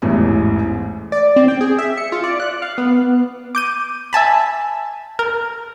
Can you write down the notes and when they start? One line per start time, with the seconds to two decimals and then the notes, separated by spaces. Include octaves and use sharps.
0.02 A1 E2 G#2 E3 G#3 A3
1.12 D5
1.36 C4
1.48 G5
1.61 G#4
1.78 E5
1.97 C#7
2.12 F4
2.24 D5
2.40 F#6
2.62 F5
2.78 B3
3.55 D6 G6 D#7
4.13 E5 G#5 A5 B5
5.19 A#4